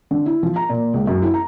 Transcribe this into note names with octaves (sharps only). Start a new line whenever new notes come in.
D3
E4
F3
A#5
A#2
C#2
F#2
E4
A#5